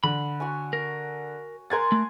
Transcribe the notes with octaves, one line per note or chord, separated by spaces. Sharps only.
D3 B5
F#4 C#5 G#5
A#4
A#4 F#5 G#5 C6 G#6 A6
A3